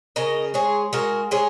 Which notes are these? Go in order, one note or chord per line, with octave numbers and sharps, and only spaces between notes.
C#3 A#4 D#5
G#3 G#4 C#5
G#3 F#4 A#4
G#3 G#4 C#5